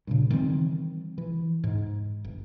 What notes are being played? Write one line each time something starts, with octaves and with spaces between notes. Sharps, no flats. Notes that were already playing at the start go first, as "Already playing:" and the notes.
G2 A#2 C#3
D#3 E3 G3 C4
E3
G#2
G1